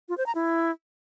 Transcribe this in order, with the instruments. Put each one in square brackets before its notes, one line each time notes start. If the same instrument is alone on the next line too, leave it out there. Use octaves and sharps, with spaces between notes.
[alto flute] F4
C5
A#5
E4